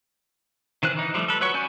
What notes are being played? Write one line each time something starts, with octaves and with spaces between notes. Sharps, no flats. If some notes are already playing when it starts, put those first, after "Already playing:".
D#3 E3 C5 F#6
E3 D#4
F3 G3 A3
A4 B4
F#3 B4 C#5 F#5 C#6
F#3 C#4 D5 G#5 G6